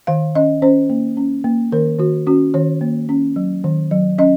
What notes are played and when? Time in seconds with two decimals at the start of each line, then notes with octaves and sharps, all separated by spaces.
0.07 D#3 F5
0.35 C#4 D#5
0.62 C#4 C5
0.90 A#3
1.17 C#4
1.44 A#3
1.72 D#3 A#4
1.99 D#3 F#4
2.27 C#4 F#4
2.54 D#3 C#5
2.81 A#3
3.09 C#4
3.36 F#3
3.64 D#3
3.91 F#3
4.18 C#4 D#5